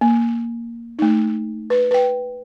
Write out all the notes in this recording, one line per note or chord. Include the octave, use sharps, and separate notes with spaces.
A#3
A3 D#4
B4
B4 G5